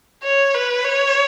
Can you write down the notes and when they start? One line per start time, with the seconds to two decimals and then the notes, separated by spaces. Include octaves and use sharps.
0.23 C#5
0.54 B4
0.84 C#5